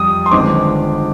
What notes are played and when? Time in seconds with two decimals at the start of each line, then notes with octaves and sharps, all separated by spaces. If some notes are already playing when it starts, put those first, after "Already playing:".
Already playing: F2 G3 D#6
0.26 C6
0.31 G1 G2 D#3 G#3 C4 D6